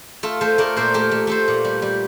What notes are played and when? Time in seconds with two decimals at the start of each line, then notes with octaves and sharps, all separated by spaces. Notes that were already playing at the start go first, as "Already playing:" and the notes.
0.23 A3 F4 A4
0.41 A3 A4 C5
0.58 A3 A#4 D5
0.76 A#2 A4 C5
0.94 A3 G4 A#4
1.11 A3
1.27 A3 A4 C5
1.48 A#2
1.65 G3
1.82 G3